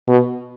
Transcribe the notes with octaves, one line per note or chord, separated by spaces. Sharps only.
B2